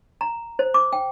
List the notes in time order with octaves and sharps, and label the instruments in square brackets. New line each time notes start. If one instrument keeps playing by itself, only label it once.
[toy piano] A#5
C5
D6
G5